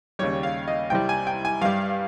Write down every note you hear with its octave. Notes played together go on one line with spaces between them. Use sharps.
D#2 C#3 G3 C#5
F5
D#5
C2 C3 G3 G5
G#5
G5
G#5
G2 G3 F5